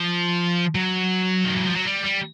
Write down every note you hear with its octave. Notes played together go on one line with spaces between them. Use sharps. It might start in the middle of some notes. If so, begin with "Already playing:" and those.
Already playing: F3
F#3
D#3
E3
F3
F#3
G3
G3